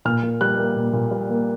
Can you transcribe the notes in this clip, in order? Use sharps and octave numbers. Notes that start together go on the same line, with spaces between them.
A#2 F6
A#2
G3 F#6
A#3
A#2
A#2
G3
A#3